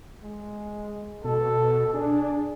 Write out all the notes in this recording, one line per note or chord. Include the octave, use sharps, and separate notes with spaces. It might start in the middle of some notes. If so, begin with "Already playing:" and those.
G#3
B2 A4
D4 G#4